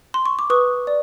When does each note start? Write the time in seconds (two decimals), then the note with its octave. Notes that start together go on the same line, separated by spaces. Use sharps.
0.14 C6
0.26 C#6
0.39 D6
0.50 B4 C#6 D#6
0.87 D5